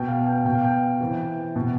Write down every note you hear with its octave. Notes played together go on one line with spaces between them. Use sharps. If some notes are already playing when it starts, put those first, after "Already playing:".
Already playing: B2 G5
F5
G5
B2 G5
F5
G5
C3 E3
B2